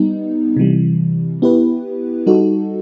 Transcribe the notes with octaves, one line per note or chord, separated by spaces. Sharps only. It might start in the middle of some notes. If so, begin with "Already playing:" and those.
Already playing: G3 B3 D#4
C3 E3 G3
B3 E4 G4 B4
G3 D#4 F#4 A4